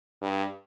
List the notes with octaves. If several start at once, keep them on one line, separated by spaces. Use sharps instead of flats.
G2